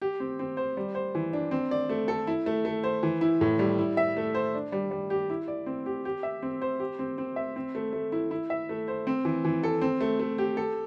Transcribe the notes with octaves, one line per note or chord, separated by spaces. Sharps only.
G4
C4
C4
C5
G3
C5
E3
D4
C4
D5
A3
A4
E4
A3
A3
C5
E3
E4
A2
G3
E4
E5
A3
C5
D4
G3
G3
G4
E4
D5
C4
G4
G4
E5
C4
C5
G4
C4
C4
E5
C4
A3
A3
E4
E4
E5
A3
C5
C4
E3
E3
A4
C4
A3
A3
G4
A4